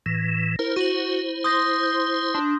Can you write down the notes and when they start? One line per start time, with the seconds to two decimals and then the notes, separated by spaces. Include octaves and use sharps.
0.06 A2 E3 A#6
0.59 E4 A#4 C5
0.76 F#4 D#7 F#7
1.44 C6 D#6 G6 A#6
1.83 G6
2.34 D4 C6